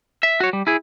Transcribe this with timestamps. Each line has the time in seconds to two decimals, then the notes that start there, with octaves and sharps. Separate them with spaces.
0.23 E5
0.40 F#4 C#5
0.53 G3
0.67 E4 G#4